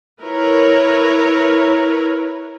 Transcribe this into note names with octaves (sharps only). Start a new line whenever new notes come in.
E4 A#4 B4 C#5